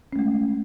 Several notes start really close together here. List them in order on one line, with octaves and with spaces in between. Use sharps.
C#4 A3 G#3